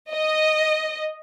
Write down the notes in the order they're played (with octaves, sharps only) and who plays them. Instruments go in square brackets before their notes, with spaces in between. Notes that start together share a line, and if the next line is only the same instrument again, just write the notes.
[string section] D#5